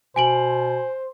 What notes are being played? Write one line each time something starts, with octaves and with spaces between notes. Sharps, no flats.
B2 C5 G#5 D7 F#7